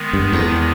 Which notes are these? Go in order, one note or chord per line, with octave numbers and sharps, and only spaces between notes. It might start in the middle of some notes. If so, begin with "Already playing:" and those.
Already playing: D#3 G#3 B3
G2
E2